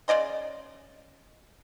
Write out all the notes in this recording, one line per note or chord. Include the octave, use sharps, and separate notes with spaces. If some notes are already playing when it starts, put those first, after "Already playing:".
C#3 D5 D#5 C6